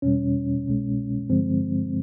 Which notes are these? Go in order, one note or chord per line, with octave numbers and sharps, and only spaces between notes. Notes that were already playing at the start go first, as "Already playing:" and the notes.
E2 B2 G3 C#4
C2 B2 G#3
G2 D3 F3 G#3 C4